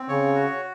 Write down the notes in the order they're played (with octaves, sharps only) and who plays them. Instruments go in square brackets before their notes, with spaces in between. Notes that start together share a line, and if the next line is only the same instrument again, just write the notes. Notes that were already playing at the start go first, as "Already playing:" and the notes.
Already playing: [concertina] C4
[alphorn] C#3 [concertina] C#5
[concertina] F#4